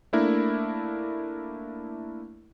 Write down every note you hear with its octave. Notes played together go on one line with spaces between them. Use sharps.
A3 A#3 D4 E4 A#4